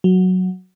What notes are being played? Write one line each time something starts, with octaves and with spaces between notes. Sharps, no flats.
F#3